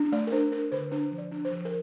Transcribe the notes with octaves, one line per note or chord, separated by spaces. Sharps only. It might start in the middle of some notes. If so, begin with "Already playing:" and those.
Already playing: D4
A3 D5
A#4
D4 C5
D4 A#4
D3 C5
D4 C5
F3
D5
D4
C5
F3
A#4